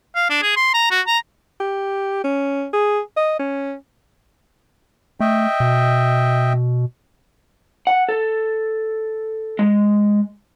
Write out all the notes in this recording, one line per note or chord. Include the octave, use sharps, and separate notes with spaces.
F5
D4
G#4
C6
A#5
F#4
A#5
G4
C#4
G#4
D#5
C#4
A3 D#5 E5 G5
B2
F#5
A4
G#3